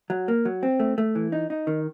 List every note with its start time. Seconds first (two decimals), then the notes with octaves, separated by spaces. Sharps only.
0.10 F#3
0.28 A#3
0.45 F#3
0.63 C4
0.80 A3
0.98 A3
1.15 E3
1.32 D#4
1.50 D#4
1.67 D#3